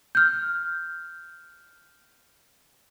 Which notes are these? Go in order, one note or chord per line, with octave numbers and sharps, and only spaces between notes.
F6 G6